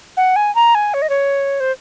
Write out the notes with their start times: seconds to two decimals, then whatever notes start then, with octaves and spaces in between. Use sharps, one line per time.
0.17 F#5
0.36 G#5
0.55 A#5
0.75 G#5
0.94 C#5
1.02 D#5
1.09 C#5
1.60 C5